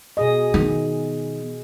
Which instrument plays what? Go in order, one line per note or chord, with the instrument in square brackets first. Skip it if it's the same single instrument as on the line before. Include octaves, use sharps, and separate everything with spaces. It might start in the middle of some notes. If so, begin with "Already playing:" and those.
[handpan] B2 G#4 D#5
[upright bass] D#3 B3